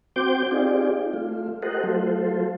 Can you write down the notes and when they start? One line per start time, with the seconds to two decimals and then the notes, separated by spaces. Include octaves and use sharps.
0.16 C4 F#4 C5 G5 D6 G6
0.51 C4 D#4 F4 G4 G#4 D5
1.13 A3 F4
1.62 G4 A4 A#4 C5 D#5 F#5
1.83 F#3 A3 F4 A4 C5